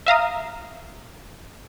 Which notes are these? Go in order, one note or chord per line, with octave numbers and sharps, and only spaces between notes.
E5 F5 A#5 D#6